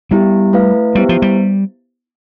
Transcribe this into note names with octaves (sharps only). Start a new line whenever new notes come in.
G3 B3 E4 G4
A3 E4 B4 F5
G3 B3 E4 G4 C5
F3
G3